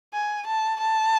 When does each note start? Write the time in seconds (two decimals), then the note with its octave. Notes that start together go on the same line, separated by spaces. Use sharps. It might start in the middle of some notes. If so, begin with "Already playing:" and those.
0.14 G#5
0.46 A5
0.80 A5